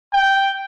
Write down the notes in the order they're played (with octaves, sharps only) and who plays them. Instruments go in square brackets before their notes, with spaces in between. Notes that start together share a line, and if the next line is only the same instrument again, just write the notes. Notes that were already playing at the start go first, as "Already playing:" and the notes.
[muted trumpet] G5